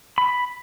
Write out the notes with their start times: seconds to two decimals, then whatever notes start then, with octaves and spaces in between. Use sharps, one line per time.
0.18 B5